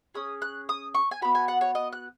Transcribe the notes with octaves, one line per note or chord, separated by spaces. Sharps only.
C#4 G#4 D#6
F#6
D#6
C#6
G#5
B3 F#4 B5
G#5
F#5
C#5
D#5
F#6